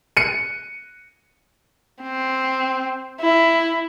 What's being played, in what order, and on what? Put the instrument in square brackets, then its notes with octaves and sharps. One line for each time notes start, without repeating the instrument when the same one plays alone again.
[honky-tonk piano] C#7 D#7
[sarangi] C4
E4